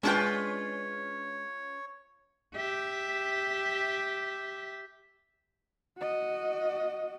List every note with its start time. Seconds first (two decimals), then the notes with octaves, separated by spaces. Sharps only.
0.03 G#3 C#4 D4 F4 B4 C#5 G5
2.55 G4 E5
5.98 F#4 D#5